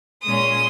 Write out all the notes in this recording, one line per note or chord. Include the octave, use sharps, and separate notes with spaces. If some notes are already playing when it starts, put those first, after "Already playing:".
A#2 G#3 C#4 C6 D#6